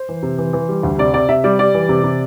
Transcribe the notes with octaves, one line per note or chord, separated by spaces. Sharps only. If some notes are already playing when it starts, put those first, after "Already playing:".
Already playing: C5
E3
C3
E3
E3
G3
D2
C3 D5
C3 D5
C3 E5
G3 D5
G3 D5
E3
C3
C3